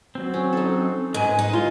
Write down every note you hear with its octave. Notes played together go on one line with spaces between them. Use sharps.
F#3 C4
C#4
D#4 A4
G#2 G#3 B4 G#5
D#4
F4 G4 C6